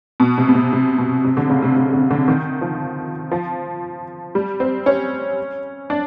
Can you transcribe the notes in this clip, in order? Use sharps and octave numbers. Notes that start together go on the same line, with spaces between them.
B2
C3
B2
C3
C3
B2
C3
D3
C#3
C3
C3
D3
D3
D#3
F3
F3
G3
C4
C#4
D4